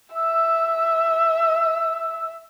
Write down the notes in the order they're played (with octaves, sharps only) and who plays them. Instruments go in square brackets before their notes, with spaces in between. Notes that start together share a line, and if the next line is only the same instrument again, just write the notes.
[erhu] E5 [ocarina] E6